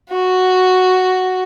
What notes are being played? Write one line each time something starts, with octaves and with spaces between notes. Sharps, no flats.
F#4